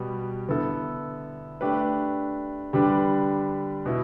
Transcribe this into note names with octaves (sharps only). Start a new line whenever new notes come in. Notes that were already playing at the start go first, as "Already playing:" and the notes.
Already playing: B2 G3 B3 G4
D3 B3 E4 A4
A3 D4 G4 B4
D3 G3 D4 G4 B4
B2 B3 E4